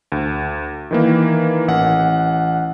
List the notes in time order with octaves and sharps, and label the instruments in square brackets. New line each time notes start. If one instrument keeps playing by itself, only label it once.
[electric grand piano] D2
D#3 E3 A#3
A1 F#5